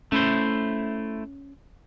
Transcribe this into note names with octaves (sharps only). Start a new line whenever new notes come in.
A3 C#4 E4 C5